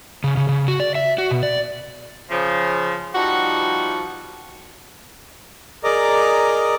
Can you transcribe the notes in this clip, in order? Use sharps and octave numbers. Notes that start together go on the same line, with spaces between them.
C#3
C#3
C#3
F#4
D5
E5
F#4
B2
D5
C#3 F3
F3 G3 D#4 F#4
G#4 A#4 D5 D#5 A#5 D6